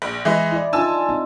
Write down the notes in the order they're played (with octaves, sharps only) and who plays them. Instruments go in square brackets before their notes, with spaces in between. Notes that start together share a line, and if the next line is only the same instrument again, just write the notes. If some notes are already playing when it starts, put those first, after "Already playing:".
[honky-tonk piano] A#1
E3 G#3 D#5
[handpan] E4 D5
[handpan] D4 D#4 F4 [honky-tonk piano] G#5 A5 E6
[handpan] C4 D#4